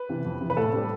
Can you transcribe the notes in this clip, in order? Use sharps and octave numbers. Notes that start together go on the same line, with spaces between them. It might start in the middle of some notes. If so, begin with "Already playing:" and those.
Already playing: B4
C3 E3
F2
C3 E3
B4
A2 A4
G3 C4